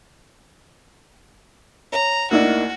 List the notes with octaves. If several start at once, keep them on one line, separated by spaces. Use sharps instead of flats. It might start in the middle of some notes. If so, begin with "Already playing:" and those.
C#5 A#5
D2 A#3 D#4 E4 F#4 D5